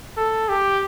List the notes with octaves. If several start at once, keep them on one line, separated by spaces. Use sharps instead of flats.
A4
G4